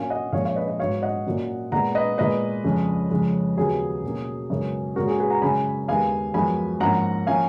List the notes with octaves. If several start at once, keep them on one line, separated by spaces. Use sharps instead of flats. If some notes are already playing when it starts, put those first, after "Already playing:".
Already playing: A#2 F#3 A#3 C#4 F5 G#5
D#5 F#5
A#2 F3 G#3 C#4 C#5 F5
C#5 F5
B4 D#5
B4 D#5
G#2 F#3 B3 C#5 F5
D#5 F#5
A#2 F#3 A#3 C#4
A#2 G#3 B3 F#5 A#5
B4 D#5
A#2 G#3 B3 B4 D#5
F2 C#3 G#3 C#4
F2 C#3 G#3 C#4
D#2 C#3 F#3 B3 G#4
B2 F#3 A#3 C#4
F#2 C#3 G#3 B3
A#2 G#3 C#4 F#4 A#4
G#4
G#4 B4
F#5 A#5
F#2 C#3 G#3 C#4 G#5 B5
D#2 D#3 G#3 B3 F5 G#5
F#2 F3 G#3 B3 G#5 B5
G#2 F3 A#3 C#4 F#5 A#5
F3 A#3 C#4 F5 G#5